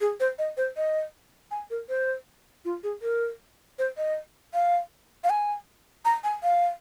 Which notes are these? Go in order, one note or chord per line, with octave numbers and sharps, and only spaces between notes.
G#4
C5
D#5
C5
D#5
G#5
A#4
C5
F4
G#4
A#4
C5
D#5
F5
F5
G#5
A#5
G#5
F5